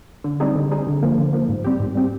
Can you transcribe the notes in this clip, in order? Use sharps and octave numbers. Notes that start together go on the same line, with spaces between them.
D3
G3 C4 D#4 G#4
D3
G3 C4 D#4 G#4
D3
F3 A#3
D3
F3 A#3
G#2
G3 C4 G4
G#2
G3 C4 G4